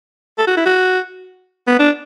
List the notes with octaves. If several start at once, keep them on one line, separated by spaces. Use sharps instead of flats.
A4
F#4
E4
F#4
B3
D4